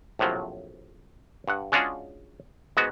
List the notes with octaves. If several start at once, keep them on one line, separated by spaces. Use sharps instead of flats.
A#1 A2 C3 F3 F#3
G2 F#5
G#3 C#4 D4 F4 F#4 G#4
G#2 G#3 B3 F#4